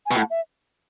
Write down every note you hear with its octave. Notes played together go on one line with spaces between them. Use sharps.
G#5
B2
A2 F#5
E5